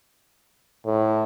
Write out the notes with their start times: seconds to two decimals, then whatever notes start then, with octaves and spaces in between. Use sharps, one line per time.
0.86 A2